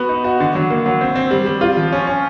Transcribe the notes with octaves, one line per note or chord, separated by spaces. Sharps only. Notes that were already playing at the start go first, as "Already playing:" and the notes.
Already playing: B3 F#4
D#4
F#4
D3
F#3
A#3
F#3
C4
C4
G3
G3
F4
F3
C#4
C#4